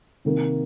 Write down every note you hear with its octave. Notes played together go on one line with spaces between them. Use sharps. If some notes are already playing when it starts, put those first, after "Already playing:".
C3 D#3 A#3